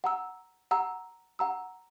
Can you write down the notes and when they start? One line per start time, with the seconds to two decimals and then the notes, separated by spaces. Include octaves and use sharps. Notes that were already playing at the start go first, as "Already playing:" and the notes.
0.04 F#5 A#5 E6
0.71 F#5 A#5 E6
1.39 F#5 A#5 E6